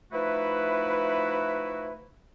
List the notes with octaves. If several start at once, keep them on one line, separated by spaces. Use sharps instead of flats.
F3 A3 D#4 E4 F#4 B4